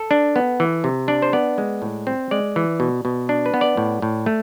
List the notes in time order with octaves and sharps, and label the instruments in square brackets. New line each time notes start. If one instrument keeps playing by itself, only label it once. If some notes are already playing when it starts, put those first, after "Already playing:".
Already playing: [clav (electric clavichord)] A4
D4
B3
E3
C3
D4 D5
C5
B3 D5
G#3
A2
C4
G#3 D5
E3
B2
B2
D4
B4
B3
D5
A2
A2
A3